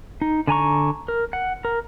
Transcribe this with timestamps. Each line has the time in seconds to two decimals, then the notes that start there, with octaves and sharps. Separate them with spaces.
0.22 D#4
0.47 D3 G#5 A#5 C#6
1.08 A#4
1.33 F#5
1.65 A#4